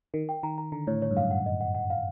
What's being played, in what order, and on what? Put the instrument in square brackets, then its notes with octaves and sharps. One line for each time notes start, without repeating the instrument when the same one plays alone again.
[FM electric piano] D#3 [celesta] A#4
[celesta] G5
[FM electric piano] D#3 [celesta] A#5
[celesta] A#5
[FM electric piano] D3 [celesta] A#5
[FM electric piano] A2 [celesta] C#5
[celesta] C#5
[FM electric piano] G2
[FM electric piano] F#2 [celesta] F5
[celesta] F#5
D#5
F#5
F#5
F5